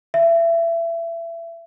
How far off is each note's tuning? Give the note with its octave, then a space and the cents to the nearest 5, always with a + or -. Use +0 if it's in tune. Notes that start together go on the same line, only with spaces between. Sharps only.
E5 +25